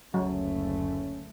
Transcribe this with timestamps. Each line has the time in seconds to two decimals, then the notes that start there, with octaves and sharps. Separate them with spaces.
0.14 F#1 D2 F#3 A3 C#4